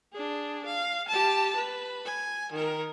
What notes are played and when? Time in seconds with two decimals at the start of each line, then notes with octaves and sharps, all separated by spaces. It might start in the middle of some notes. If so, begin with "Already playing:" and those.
0.12 D4 G#4
0.65 F5
1.08 G4 A5
1.56 B4
2.05 G#5
2.52 D#3 A#4